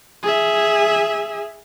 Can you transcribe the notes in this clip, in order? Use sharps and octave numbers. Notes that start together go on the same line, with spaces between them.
G#4 E5